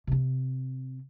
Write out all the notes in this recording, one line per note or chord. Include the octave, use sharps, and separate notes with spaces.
C3 C4